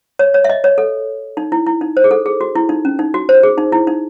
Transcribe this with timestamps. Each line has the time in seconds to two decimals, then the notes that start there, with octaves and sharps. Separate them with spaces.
0.19 C#5
0.34 C#5
0.44 E5
0.50 D#5
0.64 C#5
0.78 A4
1.37 D#4
1.52 E4
1.66 E4
1.81 D#4
1.97 C5
2.04 G#4
2.11 A4
2.26 G#4
2.41 F#4
2.55 E4
2.69 D#4
2.85 C#4
2.99 D#4
3.14 F#4
3.29 C5
3.43 G#4
3.58 D#4
3.72 E4
3.87 D#4